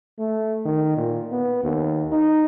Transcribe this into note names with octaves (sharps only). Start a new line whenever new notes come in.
A3
D#3
A#2
B3
D#2
D#4